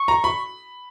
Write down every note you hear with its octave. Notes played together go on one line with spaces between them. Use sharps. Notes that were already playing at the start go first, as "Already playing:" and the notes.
Already playing: C#6
A#5
B5